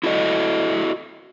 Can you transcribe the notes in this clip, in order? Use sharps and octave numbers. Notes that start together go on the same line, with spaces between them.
E4 F#4 A4 D5 D#5